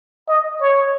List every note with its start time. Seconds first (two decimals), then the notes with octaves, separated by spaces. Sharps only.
0.28 D#5
0.61 C#5